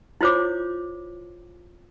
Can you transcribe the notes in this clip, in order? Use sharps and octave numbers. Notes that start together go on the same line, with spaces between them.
E4 F4 C5 C#5 D6